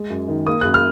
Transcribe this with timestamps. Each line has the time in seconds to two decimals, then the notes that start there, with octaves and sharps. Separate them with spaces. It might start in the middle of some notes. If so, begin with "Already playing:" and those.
Already playing: G#3
0.10 F#2
0.28 D#3
0.47 A#3 D#6
0.61 F#2 F#6
0.74 F6